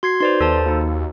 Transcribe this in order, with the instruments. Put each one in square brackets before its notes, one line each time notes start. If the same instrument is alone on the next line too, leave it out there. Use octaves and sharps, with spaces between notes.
[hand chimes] F#4 [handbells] C6 G#6 C7
[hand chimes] D#4 B4 [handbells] C5 D5 C6
[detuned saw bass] D#2 [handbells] A4 C5 A5
[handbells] A#3 D#4 [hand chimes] F#4